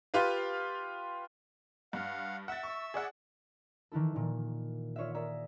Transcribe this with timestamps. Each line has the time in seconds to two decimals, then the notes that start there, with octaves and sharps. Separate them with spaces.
0.14 F4 G4 B4 F5
1.93 G2 F5 F#5
2.48 E5 F#5 E6 A6
2.63 C#6
2.94 G#4 D5 F#5
3.92 D#3 E3 E4 A4
4.16 A#2 D#3 A#3
4.96 F4 C#5 D5 E5
5.14 G#4 A#4 D5 E5 A#5